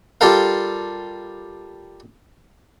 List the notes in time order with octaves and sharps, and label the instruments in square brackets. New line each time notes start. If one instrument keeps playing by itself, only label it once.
[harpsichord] G3 F4 G4 A4 A#4 F5